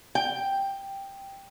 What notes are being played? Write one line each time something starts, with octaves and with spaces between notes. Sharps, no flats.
G5